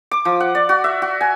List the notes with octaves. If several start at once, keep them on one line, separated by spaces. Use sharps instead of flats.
D6
F3
F#5
D5
F#4
E5
F#4
G#5